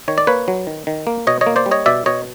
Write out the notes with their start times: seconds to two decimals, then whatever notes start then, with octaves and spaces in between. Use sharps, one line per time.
0.08 D#3 C#5
0.18 D5
0.27 A#3 B4 C#5
0.48 F#3
0.67 D#3
0.87 D#3
1.07 A#3
1.27 B2 C#5 D#5
1.41 C#5 D#5
1.46 A#3
1.56 C5 D5
1.66 G3
1.71 C#5 D#5
1.86 B2 D5 E5
2.06 B2 C#5 D#5